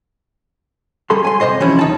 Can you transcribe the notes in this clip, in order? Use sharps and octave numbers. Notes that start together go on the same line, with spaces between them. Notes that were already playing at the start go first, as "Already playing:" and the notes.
G3 G#4 A4 C6
G#5 C6
C3 E3 C5 D#5 C6
E3 F3 G3 C#4 E4
D#2 D#4 A5